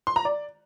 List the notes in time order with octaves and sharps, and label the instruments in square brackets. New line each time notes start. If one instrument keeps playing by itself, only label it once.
[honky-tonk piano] C6
A#5
D5